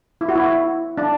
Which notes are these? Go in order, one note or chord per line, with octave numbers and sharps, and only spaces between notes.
E4
F#4
E4
D4